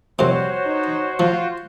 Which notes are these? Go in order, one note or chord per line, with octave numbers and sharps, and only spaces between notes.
F2 C3 G3 F#4 C5 C#5
D#4
F3 F4